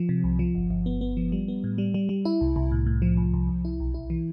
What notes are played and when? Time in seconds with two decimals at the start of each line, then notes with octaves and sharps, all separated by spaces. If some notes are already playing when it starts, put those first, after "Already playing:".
Already playing: F3
0.09 C3
0.24 C2
0.39 F3
0.55 G1
0.71 G1
0.86 B3
1.01 B3
1.17 F3
1.32 G3
1.48 B3
1.64 A2
1.78 G3
1.94 G3
2.09 G3
2.25 E4
2.41 C2
2.56 C2
2.72 A2
2.86 A2
3.02 F3
3.17 C2
3.34 C2
3.49 C2
3.65 E4
3.80 B1
3.94 E4
4.10 E3